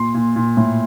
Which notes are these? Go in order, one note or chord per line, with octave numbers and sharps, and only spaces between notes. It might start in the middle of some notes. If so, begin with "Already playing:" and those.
Already playing: A#2 C6
A#2
A#2
A2